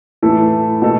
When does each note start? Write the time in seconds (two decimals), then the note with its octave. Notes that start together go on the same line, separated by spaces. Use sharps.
0.22 A2 E3 A3 E4 A4
0.82 B2 A3 A4